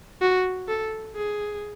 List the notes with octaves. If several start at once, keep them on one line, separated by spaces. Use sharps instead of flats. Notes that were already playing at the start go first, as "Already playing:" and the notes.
F#4
A4
G#4